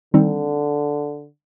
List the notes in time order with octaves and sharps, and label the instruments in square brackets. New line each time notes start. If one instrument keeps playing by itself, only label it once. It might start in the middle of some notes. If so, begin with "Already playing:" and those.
[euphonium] D3 [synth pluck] D#3 G3 C4 D#4